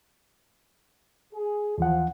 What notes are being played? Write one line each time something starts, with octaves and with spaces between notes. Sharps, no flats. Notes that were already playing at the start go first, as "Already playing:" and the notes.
G#4
D#2 E3 F3 F#5